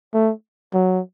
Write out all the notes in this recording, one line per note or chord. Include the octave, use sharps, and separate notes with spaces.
A3
F#3